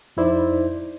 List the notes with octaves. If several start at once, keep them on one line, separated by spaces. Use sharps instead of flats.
F2 D#4 E4 C5 D5